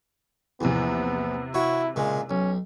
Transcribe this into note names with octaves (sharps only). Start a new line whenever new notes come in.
A#1 E2 C3 E3 B3
E4 F#4 C#5
A#2 C#3 G#3
B1 C#4